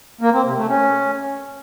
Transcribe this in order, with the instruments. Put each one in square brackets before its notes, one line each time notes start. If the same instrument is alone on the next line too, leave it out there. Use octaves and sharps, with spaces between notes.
[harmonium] A#3
C4
C3
A3
C#4